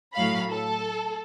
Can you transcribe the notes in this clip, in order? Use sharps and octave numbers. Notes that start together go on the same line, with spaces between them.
A2 F#3 F5 B5
A4